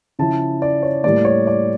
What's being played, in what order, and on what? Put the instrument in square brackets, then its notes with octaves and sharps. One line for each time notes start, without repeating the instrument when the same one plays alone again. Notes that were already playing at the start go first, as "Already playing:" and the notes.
[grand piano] C#3 F3 C#4 E4 A5
D5
C#5
A2 G3 A#3 D5
C#5
D5